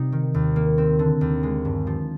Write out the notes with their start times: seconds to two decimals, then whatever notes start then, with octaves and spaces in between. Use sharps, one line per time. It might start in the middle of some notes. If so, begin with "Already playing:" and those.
Already playing: C3 G3 D#4
0.12 D#3
0.34 D#2
0.56 A#3
0.78 C4
0.99 D3
1.21 D#2
1.43 G#3
1.65 G2
1.87 F3